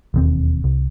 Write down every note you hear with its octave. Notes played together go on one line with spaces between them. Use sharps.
E1 D#2 C4
C2